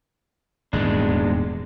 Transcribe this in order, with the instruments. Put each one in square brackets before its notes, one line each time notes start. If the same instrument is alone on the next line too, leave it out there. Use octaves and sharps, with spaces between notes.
[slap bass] D#1 E2 G#2 [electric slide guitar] G#3 D4